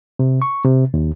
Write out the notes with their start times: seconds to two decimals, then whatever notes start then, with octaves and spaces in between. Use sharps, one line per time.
0.19 C3
0.42 C#6
0.65 C3
0.94 D#2